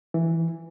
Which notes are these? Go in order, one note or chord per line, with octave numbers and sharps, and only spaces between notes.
E3